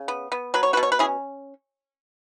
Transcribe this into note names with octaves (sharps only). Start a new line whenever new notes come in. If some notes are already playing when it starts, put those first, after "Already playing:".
Already playing: C#3
B3
B3
F#3 B4
C#5
F#4 B4
B2
C#5
B4
C#4 E4 G#4